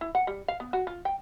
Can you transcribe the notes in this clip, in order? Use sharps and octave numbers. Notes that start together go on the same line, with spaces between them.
E4
F#5
G3
F5
B3
F#4
F4
G5